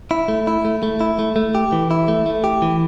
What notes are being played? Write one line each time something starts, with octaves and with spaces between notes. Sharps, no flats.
E4
A3
E4
A3
A3
E4
A3
A3
G4
E3
E4
A3
A3
G4
E3